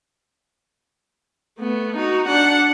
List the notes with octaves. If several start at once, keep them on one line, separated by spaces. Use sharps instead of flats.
A3 B3
D#4 F#4
D4 F#5